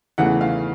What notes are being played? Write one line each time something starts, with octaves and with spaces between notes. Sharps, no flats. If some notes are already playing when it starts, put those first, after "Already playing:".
E2 C#3 E3 A3 F#5
F5